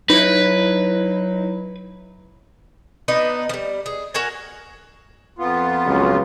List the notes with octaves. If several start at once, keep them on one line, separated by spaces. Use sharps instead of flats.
F#3 D#4 E4 B4
B3 D4 D#4 B4
F3 G3
G#4
F#4 A#4 F#5 G#5
F2 B3 F4
C#2 F#3